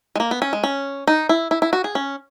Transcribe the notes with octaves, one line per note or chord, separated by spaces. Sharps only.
G#3
A#3
B3
C#4
G#3
C#4
D#4
E4
E4
E4
F#4
G#4
C#4